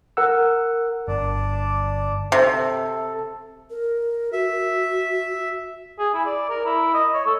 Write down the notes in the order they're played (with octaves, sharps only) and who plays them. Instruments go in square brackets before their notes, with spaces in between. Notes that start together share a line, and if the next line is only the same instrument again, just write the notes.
[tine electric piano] A#4 F#5 E6
[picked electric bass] G1 [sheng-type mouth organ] D4 D5
[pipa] C3 [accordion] A4
[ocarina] A#4
[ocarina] F#4 [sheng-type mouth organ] E5
[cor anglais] G#4
E4
D5
A#4
E4
D#5
C#5
A4